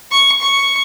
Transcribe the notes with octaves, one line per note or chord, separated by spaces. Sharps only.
C#6
C#6